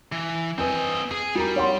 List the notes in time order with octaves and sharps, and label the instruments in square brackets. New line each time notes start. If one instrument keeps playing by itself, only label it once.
[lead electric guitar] E3
[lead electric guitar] C4 D#5 [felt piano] B4 G#5
[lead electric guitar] G#4
[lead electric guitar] G3 [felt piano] F#4 A#4 A#5
[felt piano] C#5 F#5 C6